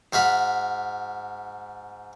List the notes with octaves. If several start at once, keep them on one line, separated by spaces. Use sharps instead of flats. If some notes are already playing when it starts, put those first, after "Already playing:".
G#2 F#4 F5 B5